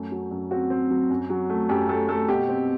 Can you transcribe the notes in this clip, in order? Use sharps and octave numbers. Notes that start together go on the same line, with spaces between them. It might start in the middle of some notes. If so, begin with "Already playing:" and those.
Already playing: F#2 A3
F#3
F#2
C4 F#4
C4
F#3
F#2
F#3
A3
F#2 G4
A3 A4
A3 A4
B2 G4
C4